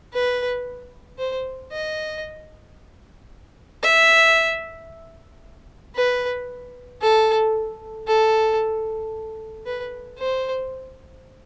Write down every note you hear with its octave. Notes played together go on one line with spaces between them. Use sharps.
B4
C5
D#5
E5
B4
A4
A4
B4
C5